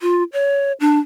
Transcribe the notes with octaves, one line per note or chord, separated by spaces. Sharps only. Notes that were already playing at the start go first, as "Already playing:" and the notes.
F4
C#5
D4